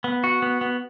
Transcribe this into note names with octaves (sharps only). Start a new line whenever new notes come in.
B3
F#4
B3
B3